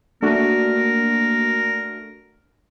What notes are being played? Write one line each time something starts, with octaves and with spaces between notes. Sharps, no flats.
A3 A#3 D4 F#4 A#4